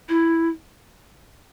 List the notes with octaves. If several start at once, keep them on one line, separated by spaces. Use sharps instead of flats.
E4